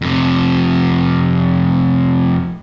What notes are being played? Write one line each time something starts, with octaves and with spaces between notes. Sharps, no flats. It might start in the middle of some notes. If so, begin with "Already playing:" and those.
F2 C3